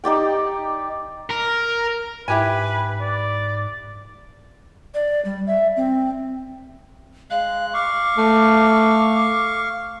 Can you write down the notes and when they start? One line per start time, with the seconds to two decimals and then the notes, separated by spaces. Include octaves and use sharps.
0.04 D#4 G4 D5 G5
1.30 A#4
2.28 G#2 E4 G4 B4 G#5
3.01 D5
4.94 D5
5.25 G3
5.47 E5
5.77 C4
7.30 G#3 F5 F#6
7.74 F5 C#6 D6
8.18 A3